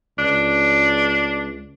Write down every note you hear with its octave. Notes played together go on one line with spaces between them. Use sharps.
C#2 D4